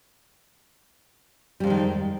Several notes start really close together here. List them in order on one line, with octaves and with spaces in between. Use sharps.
G3 F2 G#3 D#3